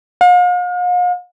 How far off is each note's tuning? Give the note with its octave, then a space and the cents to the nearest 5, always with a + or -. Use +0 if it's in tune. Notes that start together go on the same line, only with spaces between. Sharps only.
F5 +45